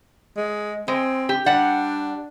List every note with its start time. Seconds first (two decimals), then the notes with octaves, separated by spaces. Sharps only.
0.37 G#3
0.88 G#3 C4
1.29 G4
1.46 G3 D4 F#5